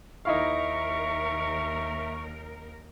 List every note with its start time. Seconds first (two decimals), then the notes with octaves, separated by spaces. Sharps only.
0.25 D#2 D#4 E4 A#4 E5 F5 C#6